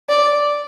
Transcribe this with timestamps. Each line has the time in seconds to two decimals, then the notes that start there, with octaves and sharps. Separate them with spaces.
0.09 D5